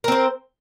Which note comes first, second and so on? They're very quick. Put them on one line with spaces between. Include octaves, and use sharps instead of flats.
A#4 C4 C5